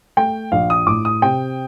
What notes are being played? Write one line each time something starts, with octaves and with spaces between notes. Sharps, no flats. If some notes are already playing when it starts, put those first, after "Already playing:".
A3 G5
A#1 F5
D#6
A2 D6
D#6
C3 G5